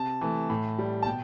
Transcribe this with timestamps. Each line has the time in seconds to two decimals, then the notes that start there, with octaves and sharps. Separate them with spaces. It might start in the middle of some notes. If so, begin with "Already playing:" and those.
Already playing: C3 A5
0.21 E3 A3
0.50 A2
0.79 G3
1.02 A5
1.06 B2 G5